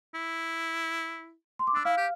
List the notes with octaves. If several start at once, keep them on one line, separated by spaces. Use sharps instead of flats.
E4
C6
D6
D4 E6
E4 F5 F6
G4